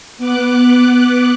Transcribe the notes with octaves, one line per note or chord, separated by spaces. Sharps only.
B3 D6 F#6